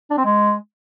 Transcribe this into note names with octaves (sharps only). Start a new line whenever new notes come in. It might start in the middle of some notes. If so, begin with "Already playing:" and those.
D4
C4
G#3